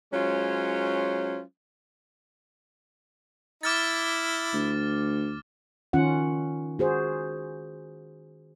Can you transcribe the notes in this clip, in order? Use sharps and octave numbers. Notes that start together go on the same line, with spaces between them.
F#3 G#3 C#4 F4 C5 C#5
E4 D6 F6 A6
D2
D#3 C#4 F4 F#5
F#4 G#4 C5